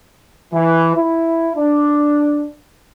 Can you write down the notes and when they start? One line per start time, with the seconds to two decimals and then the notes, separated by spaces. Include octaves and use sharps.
0.53 E3
0.95 E4
1.55 D4